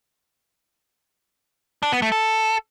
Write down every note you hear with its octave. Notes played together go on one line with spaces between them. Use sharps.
D4
B3
A3
A4